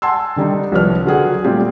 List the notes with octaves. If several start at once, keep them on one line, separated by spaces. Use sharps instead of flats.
F#5 G#5 A5 C6 E6
D3 D#3 G3 D4 D#4
C2 F3 B4 C#5 F6
D3 F#3 G#4 F#5
A#2 G3 A3 C4 F4 G4